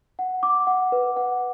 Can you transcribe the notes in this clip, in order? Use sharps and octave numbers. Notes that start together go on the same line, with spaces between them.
F#5
D6
F#5
B4
F#5